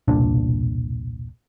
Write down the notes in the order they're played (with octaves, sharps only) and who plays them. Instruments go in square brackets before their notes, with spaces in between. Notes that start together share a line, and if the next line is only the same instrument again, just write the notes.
[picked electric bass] E1 C2 A#2 D4